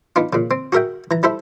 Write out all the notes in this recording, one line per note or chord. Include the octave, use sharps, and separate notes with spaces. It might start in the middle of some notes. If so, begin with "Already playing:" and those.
B3 D4 D#4 F4
A#2 C#3
C4
F#4 G#4 A#4 E5 G5
E3 A#5
G3 E4 A4 C5 E5